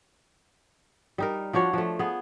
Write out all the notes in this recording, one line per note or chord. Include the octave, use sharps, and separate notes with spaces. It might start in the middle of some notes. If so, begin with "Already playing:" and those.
G3 D#4 A#4
F3 D4 F#4 C#5
F3 A3
B3 G#4